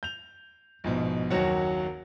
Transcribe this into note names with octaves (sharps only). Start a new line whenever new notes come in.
G6 F7
A#1 G#2 B2
F#1 D#2 F#3 F#4 C#5 F#5